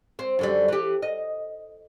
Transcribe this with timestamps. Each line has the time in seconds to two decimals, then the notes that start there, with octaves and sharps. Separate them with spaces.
0.19 C4
0.39 F#2 D3 G3
0.68 E3 G4
1.02 D#5